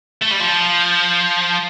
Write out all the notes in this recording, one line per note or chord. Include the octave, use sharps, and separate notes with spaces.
A3
G3
F3